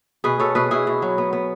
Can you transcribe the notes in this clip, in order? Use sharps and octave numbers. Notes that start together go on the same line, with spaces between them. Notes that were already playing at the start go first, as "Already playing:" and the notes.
B2 G#4 B4
B2 A4 C#5
B2 G#4 B4
B2 E4 G#4
B2
F#3
B3
B3